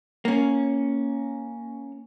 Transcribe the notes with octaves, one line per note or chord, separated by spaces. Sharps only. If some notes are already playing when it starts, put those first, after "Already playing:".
A#3 C#4